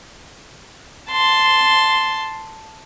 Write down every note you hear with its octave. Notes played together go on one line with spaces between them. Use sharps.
A5 C6